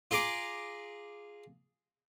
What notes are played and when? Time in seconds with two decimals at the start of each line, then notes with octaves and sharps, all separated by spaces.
0.11 F4 G#4 A#5 D6